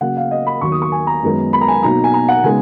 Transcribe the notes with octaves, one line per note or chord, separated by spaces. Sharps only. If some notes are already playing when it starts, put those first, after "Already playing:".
C#3 F#3 A#3 F#5
F5
D#5
B5
D#2 D#3 F#3 C#6
D#6
C#6
G#5
A#5
F#2 D#3 G#3 B3
B5
A#5
G#5
B2 F#3 A#3 D#4 A#5
G#5
A#5
F#5
C#3 G#3 B3 D#4 G#5